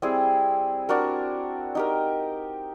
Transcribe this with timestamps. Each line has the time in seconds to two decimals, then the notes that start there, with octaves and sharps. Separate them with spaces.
0.02 G3 C4 E4 G#4
0.89 D4 F#4 A#4
1.75 D#4 G4 A#4